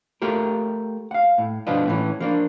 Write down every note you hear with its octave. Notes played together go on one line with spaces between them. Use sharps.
A3 F4 G4 A#4
F5 F#5
A2
G2 B2 F3 B3 D4 F4
A2 E3 C#4
F3 A#3 D4